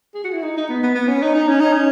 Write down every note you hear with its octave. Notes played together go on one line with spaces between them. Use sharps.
G#4
F#4
E4
D#4
D#4
B3
B3
B3
C#4
D#4
D#4
C#4
D#4
C#4